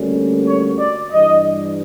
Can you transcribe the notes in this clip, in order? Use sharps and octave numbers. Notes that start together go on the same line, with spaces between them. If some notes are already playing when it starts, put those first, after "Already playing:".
Already playing: D2 D3 G3 A#3 C#4
C#5
D5
G2 E3 G3 D#5